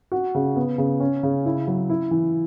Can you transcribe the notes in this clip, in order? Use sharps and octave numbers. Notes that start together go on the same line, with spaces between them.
F#4
C#3
B3
C#3
C#4
C#3
E4
F#3
E4
E3